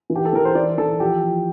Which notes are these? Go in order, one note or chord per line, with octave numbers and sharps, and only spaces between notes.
E3
G4
A4
E3 A#4
C5
E3 D5
E3 A4
F3 G4
F3